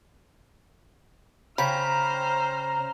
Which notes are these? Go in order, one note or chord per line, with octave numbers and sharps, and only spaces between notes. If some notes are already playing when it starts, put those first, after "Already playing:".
C#3 C5 G5 A#5 B5 F6